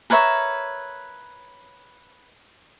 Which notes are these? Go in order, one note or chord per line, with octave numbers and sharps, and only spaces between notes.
A#4 B4 C#5 E5